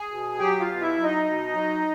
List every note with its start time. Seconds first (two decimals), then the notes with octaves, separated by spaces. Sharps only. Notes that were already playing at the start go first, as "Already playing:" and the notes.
Already playing: G#4 G#5
0.11 B2
0.39 F#3 G4 G5
0.60 F4 F5
0.68 B2
0.82 E4 E5
0.97 F#3
1.03 D#4 D#5
1.26 B2
1.54 F#3